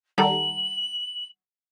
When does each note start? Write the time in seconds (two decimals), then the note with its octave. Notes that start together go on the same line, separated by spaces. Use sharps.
0.18 D#3 G3 A4 F#5 A5 A#5 F#7